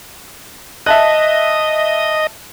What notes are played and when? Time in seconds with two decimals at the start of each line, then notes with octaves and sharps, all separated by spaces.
0.86 D#5 E5 A5 F#6